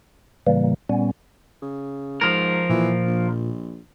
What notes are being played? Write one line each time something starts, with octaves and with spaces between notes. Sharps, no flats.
A2 C#3 E3 G3 A#3
A#2 G3 B3 C#4
C#3
G#2 F3 A#4
A#2 E3
A#1